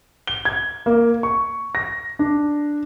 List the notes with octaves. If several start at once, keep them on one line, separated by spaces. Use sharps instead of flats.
G7
G#6
A#3
C#6
A#6
D4